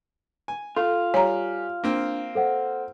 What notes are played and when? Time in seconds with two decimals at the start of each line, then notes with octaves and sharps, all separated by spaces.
0.48 G#5
0.77 F4 A4
1.14 G3 C#5 G#5 A#5
1.84 A#3 C4 D4
2.35 A4 C5 F#5